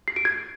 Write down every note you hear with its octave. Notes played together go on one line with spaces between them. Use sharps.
C7
D7
G#6